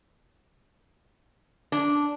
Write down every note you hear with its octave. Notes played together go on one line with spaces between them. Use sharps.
D4